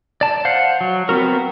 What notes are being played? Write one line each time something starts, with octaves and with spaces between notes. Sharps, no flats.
D5 A5
C5 F5 F#5
F#3
B3 C4 F#4 A#4